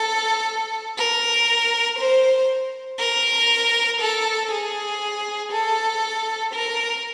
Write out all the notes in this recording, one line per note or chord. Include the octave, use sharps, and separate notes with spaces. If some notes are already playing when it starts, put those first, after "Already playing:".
Already playing: A4
A#4
C5
A#4
A4
G#4
A4
A#4